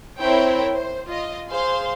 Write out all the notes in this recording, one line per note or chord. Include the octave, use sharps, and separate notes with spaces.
C4 E4 A#4 C5 C#5 G5
C5
F4 D#5
G#4 C5 F5 C6